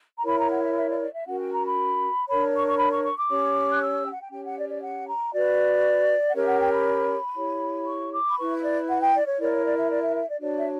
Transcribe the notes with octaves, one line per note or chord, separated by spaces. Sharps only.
A#5
E4 A#4 C#5 B5
A#5
F#5
E5
E5
D5
D5
E5
C#4 F#4 A#4 F#5
G5
A#5
B5
D4 A#4 C#5 B5
C#6
C#6
B5
C#6
C#6
D6
C#4 G4 C#5
F#6
E6
G5
F#5
G5
C#4 G4 C#5 G5
F#5
D5
D5
F#5
A#5
F#4 B4 D5
F#5
C#4 G4 A#4 C#5 E5
F#5
G5
B5
E4 G4 C#5
C#6
D6
B5
E4 B4 C#6
E5
D5
F#5
G5
D5
C#5
E4 A#4 C#5 D5
C#5
D5
E5
D5
E5
E5
D5
D4 F#4 C#5 D5
E5